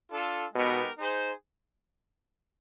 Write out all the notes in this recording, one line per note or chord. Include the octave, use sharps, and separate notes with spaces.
D4 F4 A4
B2 G#3 B3 D#4 G4 A#4
D#4 G#4 C5